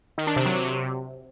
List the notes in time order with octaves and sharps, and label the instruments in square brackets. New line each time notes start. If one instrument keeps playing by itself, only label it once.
[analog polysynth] D#3
D4
C3
F#3
C3